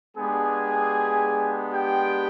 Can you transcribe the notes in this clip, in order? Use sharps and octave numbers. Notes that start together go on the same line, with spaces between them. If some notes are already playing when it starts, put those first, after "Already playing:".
G#3 B3 D4 G4 G#4 G#5
G4 G5